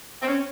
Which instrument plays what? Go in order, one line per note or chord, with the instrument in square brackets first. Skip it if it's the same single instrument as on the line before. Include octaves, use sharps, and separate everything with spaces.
[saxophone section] C4
C#4